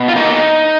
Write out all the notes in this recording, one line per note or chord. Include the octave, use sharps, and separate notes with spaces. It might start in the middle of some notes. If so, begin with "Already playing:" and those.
Already playing: B2
F4
A#3 D#4